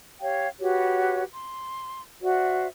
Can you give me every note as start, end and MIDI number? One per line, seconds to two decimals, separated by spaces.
0.21 0.47 67
0.21 0.47 73
0.21 0.47 77
0.21 0.47 79
0.61 1.23 66
0.61 1.23 67
0.61 1.23 71
0.61 1.23 73
1.33 2.02 84
2.22 2.68 66
2.22 2.68 72
2.22 2.68 74
2.22 2.68 76